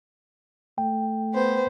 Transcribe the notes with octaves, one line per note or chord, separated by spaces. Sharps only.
A3 G5
B3 C5